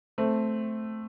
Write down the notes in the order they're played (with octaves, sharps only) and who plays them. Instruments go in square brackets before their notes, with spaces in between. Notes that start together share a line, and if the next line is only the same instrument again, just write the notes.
[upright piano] A3 C4